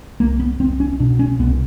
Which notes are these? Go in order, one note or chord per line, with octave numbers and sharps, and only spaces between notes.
C2 A#3
B3
C2 C4
C#4
B2 D4
C#4
C2 B3